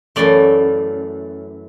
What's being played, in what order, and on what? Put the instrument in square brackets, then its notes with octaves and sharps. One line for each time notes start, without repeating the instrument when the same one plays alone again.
[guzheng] F#2 E3 A3 D5